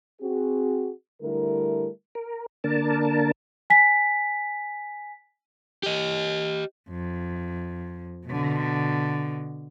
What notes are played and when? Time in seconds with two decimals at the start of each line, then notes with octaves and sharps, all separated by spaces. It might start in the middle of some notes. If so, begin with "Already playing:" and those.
0.21 C4 F#4 G#4
1.22 D3 G3 A3 E4 A#4
2.15 A#4
2.64 D3 A#3 D4 A#4 A5
3.70 G#5 B6
5.83 G4 D#5
6.90 F2
8.27 B2 D3